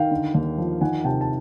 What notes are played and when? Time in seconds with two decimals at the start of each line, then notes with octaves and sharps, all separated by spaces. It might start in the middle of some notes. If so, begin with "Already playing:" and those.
Already playing: D#3 F5 G5
0.11 D3
0.35 D#2
0.58 F3
0.81 D#3 F#5 G#5
1.04 C3 G5 A5
1.21 A5